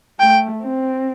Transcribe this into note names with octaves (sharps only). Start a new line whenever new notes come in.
A3 G5
C4